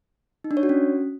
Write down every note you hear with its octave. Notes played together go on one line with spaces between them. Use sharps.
D#4
D4
C#5
F#4
C#4